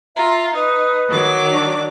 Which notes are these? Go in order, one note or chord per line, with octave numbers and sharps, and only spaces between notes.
F4 E5 A#5
D#4 B4 D#6
D#3 F#3 D6
D4